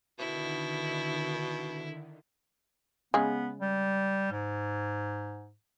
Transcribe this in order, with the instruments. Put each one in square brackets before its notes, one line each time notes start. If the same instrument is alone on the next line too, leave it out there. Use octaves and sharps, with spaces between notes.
[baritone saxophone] B2 [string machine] D3 D#3 [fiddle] E4
[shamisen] C#3 G#3 [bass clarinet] B3
[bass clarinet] G3
G#2